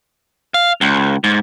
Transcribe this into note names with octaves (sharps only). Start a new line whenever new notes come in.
F5
C#2
G#2